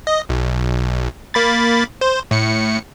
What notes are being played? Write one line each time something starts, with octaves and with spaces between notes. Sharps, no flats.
D#5
B1
A#3 B5 A6
C5
A2 C#7